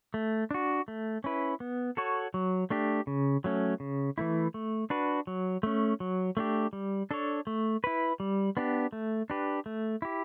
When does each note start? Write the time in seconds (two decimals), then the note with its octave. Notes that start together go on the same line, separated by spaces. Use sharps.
0.14 A3
0.51 D4 F#4
0.88 A3
1.24 C#4 E4 B4
1.60 B3
1.97 F#4 A4 C#5
2.34 F#3
2.70 A3 D4 G4
3.07 C#3
3.44 F#3 A3 C#4
3.80 C#3
4.18 E3 A3 E4
4.54 A3
4.90 D4 F#4 B4
5.27 F#3
5.63 A3 C#4
6.00 F#3
6.37 A3 D4 G4
6.73 G3
7.11 D4 A4 C#5
7.47 A3
7.84 E4 B4
8.20 G3
8.57 B3 D4 G4
8.92 A3
9.30 D4 G4 B4
9.66 A3
10.02 E4 G4